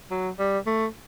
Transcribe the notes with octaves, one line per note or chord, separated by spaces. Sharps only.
F#3
G3
A3